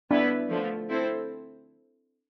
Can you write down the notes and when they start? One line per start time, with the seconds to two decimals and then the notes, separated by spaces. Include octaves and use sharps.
0.11 B3 D4 E4 B4
0.50 D3 F3 A3
0.90 C4 E4 A4 C5